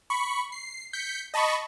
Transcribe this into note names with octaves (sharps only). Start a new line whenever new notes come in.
B5 C#6
C7
G6 B6 C#7
D#5 A5 B5 C#6